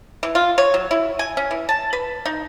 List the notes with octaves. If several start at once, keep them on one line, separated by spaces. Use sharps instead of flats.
E3
F4
C#5
F#3
E4
G#5
C#4
E3
A5
B4
D#4